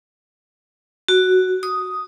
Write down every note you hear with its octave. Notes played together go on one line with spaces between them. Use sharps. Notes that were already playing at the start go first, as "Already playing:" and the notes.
F#4
D#6